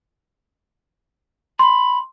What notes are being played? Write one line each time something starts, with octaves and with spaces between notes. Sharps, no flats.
B5 C6